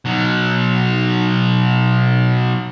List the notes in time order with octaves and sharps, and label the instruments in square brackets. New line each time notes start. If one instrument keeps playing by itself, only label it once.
[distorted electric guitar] B2 F#3